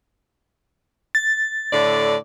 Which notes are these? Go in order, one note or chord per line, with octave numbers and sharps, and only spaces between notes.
A6
A2 D3 D5